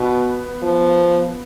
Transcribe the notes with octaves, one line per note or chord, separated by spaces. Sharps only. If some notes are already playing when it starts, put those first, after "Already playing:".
Already playing: B2 B3
F3